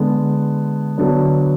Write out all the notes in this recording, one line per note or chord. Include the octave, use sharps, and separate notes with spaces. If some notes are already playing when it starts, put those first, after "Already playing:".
Already playing: D3 G#3 B3
D3 F#3 B3 D4